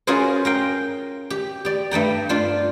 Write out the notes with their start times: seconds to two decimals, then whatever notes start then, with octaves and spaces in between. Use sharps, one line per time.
0.07 C#4 F4 F#4 G#4 A#4 C5
0.45 A#4 F5 G5
1.30 G4
1.65 G4 D5
1.91 G2 A3 G5 A#5
2.29 D4 F4 C5